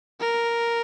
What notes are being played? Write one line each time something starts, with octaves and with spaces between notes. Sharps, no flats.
A#4